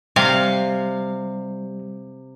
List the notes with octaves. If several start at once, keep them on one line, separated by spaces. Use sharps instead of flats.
C3 G3 F5